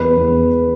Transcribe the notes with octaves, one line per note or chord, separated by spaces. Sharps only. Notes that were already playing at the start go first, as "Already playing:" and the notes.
Already playing: E2 B4
E2